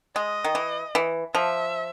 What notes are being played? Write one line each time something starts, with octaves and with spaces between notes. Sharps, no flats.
G#3 D#5
D#3
E3
E3
F3 E5